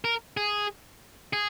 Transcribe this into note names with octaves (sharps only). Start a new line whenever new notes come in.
A#4
G#4
G#4